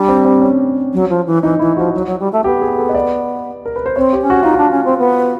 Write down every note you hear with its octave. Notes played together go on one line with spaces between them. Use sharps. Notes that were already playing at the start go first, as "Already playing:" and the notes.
Already playing: G3 D4
C4
C4
C#4
F#3
F3
E3
E3 D#4
E3 E4
F3 F#4
F#3
F#3
G3
A3
B3 G4
G#4
A4
D#5
D5
A#4
B4
C5
C4 C#5
G4
C#4
F#4
D#4 F4
D4 F#4
C#4
C4
B3